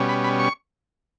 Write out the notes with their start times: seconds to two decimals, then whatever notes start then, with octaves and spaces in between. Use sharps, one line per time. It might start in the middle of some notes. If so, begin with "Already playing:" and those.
Already playing: B2 G3 C#4
0.09 B5
0.24 B5
0.39 C#6